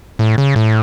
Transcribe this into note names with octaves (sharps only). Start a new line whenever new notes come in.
A2
C#3
A2